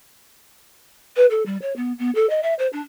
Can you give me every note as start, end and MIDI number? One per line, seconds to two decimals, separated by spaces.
1.16 1.26 71
1.31 1.45 69
1.46 1.57 55
1.62 1.75 73
1.76 1.93 59
1.99 2.11 59
2.15 2.28 69
2.30 2.43 75
2.43 2.54 76
2.59 2.68 72
2.73 2.81 62